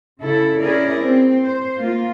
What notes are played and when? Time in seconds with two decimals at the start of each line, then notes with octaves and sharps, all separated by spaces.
0.22 C#3 E4 A4
0.62 C#4 E4 G#4 A#4 D5
1.03 C4
1.41 C5
1.78 A#3 F4